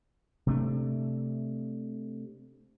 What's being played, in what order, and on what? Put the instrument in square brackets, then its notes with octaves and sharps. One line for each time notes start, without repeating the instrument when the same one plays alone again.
[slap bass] C3 A3 D4